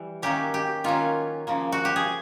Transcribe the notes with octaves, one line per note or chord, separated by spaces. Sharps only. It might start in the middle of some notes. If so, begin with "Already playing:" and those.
Already playing: E3 G3
D#3 F#3 A#3 C#4 G4
G4
D#3 F#3 A#3 C#4 F4
C#3 F3 A#3
F#4
G4
G#4